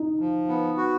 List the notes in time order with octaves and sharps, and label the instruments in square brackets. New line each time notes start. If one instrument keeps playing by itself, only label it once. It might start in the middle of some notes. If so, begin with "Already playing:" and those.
Already playing: [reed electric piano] D#4
[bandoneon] F3
B3
F#4